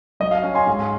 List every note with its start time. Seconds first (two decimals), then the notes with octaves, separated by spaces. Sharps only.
0.20 F#3 D#5
0.31 F5
0.43 C#4
0.55 G#5 C6
0.67 G#2